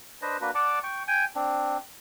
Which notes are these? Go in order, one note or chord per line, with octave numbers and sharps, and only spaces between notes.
D4 B4 C5 D#5
A#3 D4 F#4 B4
D5 F#5 A5 D6
G5 C#6
G5 G#5
C4 D4